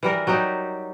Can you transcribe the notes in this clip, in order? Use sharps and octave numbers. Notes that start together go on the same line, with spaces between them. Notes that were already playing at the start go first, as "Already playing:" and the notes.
E3 G3 A#4
F#3 G3 D#4 G4